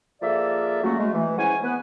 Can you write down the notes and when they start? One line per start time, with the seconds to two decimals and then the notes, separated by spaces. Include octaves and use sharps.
0.22 F3 A#3 G#4 A4 D5 E5
0.83 F3 F#3 A3 A#3 C#4 F#4
0.98 G#3 A3
1.14 E3
1.38 G#3 C#4 E4 C5 F#5 G#5
1.63 B3 B4